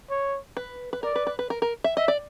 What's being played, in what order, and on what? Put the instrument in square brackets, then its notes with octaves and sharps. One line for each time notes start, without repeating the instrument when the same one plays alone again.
[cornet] C#5
[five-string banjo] B4
B4
[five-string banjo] A#4 [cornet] D5
[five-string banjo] B4
B4
B4
A#4
A#4
E5
[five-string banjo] D#5 [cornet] E5
[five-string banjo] D5